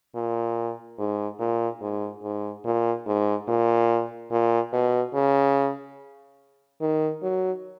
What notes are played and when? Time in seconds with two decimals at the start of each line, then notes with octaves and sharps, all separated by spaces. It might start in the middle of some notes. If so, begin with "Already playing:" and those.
0.15 A#2
0.99 G#2
1.39 A#2
1.81 G#2
2.23 G#2
2.64 A#2
3.06 G#2
3.48 A#2
4.31 A#2
4.73 B2
5.14 C#3
6.81 D#3
7.23 F#3